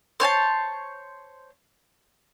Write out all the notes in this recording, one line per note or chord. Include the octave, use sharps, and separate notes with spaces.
C5 C#5 G#5 A5